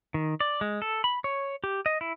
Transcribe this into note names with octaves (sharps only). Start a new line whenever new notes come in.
D#3
D5
G#3
A4
B5
C#5
G4
D#5
E4